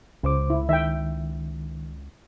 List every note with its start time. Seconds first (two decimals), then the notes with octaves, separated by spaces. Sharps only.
0.23 C#2 C#3 C5 D6
0.50 E4
0.69 D#3 E5 G5